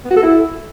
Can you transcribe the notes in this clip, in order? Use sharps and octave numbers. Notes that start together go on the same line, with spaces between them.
B3
F#4
A4
E4